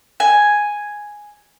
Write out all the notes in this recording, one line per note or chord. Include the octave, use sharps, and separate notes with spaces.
G#5